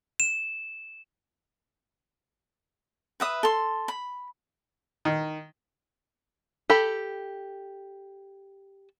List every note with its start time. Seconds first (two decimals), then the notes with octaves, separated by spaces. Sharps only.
0.20 E7
3.20 B4 E5 D#6
3.43 A4 C6
3.88 B5
5.05 D#3
6.70 G4 A4 B5